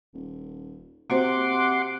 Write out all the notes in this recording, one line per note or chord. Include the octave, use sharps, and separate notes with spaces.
D#1
C3 A#3 F#4 C5 F#5 C6 D6